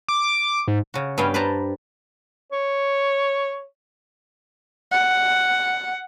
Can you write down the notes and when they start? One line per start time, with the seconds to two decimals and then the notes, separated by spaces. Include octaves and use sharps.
0.09 D6
0.68 G#2
0.94 C#3 F#4
1.18 G2 B3 C#4 F5 G5
1.34 B4 C5 D5 A5 A#5
2.52 C#5
4.92 F#5